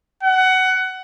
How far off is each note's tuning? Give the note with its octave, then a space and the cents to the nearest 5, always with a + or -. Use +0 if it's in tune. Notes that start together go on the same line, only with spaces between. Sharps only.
F#5 +20